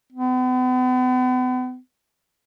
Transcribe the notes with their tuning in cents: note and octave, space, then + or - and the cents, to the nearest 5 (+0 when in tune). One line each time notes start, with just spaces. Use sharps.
B3 +40